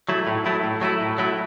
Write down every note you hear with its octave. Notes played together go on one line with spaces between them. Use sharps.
F#3 A3 E4
A2
F#3 A3 E4
A2
F#3 A3 E4
A2
F#3 A3 E4